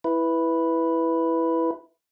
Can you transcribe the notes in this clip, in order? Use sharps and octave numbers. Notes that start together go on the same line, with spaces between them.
E4 B4